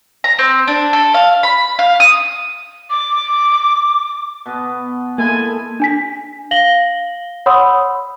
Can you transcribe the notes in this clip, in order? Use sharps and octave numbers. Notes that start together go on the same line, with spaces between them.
A#5
C4
D4
A4
F5
B5
F5
D#6
D6
B2 B3 B4
G#3 A#3 E4 A4 G#5
D4 G#5 B6
F5 A#6 F#7 G7
C#5 F#5 B5 C6 D#6 E6